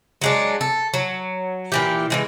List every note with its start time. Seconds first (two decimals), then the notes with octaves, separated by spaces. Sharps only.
0.21 F#3 G#3 D4
0.61 A4
0.94 F#3
1.72 A#2 E3 G4
2.10 E3 F3 G#3